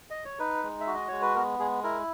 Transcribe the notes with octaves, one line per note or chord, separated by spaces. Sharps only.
D#5
C#5
D#4 B4
G#3
E5
F#4
D#5
G#3 C#5
B4
B3 A#4
G#3 G#4
E4 A#4